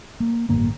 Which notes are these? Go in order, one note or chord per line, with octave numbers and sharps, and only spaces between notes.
A#3
A1 G2 D3 A#3